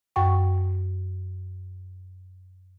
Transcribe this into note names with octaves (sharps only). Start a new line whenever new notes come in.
F#2 F#5 G5 C#6